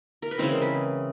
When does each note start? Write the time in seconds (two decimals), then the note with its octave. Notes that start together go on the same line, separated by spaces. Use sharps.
0.22 A#4
0.31 B4
0.38 C#3 E3 G#3 C4 A#4 C5
0.62 B4